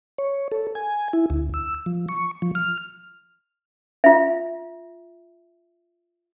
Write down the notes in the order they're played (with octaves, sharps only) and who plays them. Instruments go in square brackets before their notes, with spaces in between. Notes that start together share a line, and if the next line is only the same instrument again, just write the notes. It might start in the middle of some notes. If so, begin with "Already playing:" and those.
[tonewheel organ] C#5
A4
G#5
E4
D2
E6
F3
C#6
F3
F6
[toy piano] F4 E5